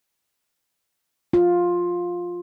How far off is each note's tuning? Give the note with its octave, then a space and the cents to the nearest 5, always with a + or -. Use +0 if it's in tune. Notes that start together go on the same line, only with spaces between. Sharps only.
F4 +10